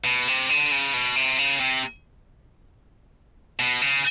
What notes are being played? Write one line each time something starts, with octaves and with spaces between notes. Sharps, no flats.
B2
C3
D3
C#3
B2
C3
C#3
C3
B2
C#3